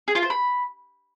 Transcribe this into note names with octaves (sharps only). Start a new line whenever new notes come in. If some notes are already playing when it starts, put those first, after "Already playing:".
G#4
F4
C5
B5